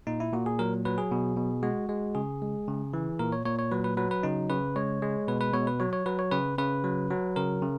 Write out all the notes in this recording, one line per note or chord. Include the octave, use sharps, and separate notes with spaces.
A#2 D#4
E4
A#2 F#4
G#4
F#3 A#4
F#3 B4
G#4
B2
B2
G#3 F#4
G#3
C#3 G#4
G#3
C#3
E3
A#2 A#4
C#5
A#2 C#5
C#5
F#3 B4
B4
F#3 B4
B4
C#3 D#4
C#3 B4
G#3 C#5
G#3
B2 B4
B4
B2 C#5
B4
F#3 C#5
C#5
F#3 B4
C#5
C#3 B4
C#3 B4
F#3
F#3
C#3 A#4
C#3